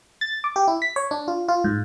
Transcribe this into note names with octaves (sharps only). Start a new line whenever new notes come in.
A6
D6
G4
E4
B6
C#5
D4
F4
F4
G#2